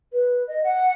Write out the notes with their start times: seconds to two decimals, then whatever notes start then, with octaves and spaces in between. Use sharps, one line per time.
0.13 B4
0.48 D#5
0.64 F#5